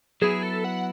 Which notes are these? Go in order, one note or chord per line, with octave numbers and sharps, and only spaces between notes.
F#3 B3 E4 G#4
A4
F#5